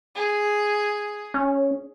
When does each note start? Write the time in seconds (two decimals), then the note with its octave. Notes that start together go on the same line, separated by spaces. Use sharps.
0.15 G#4
1.34 C#4